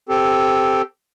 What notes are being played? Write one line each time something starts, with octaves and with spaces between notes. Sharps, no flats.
C4 G4 A4